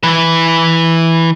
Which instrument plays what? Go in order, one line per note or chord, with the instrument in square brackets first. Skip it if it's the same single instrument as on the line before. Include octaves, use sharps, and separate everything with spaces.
[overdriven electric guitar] E3 B4